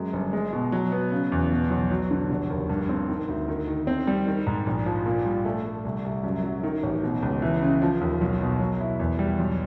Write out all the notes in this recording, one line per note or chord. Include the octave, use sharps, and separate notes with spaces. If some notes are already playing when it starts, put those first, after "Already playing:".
Already playing: F#2 G#3
G1
G#3
B2
F#3
B3
C#3
E2
B2
B1
F#3
D3
F1
D#2
G2
C4
D#3
D2
D#3
D#3
C4
G3
D#3
G#2
A#1
F3
A#2
G3
A3
A3
C2
C2
F#2
F#3
D#3
A1
B2
C#2
E3
C#3
F3
D#2
B1
B2
F#3
E4
E2
G3
B1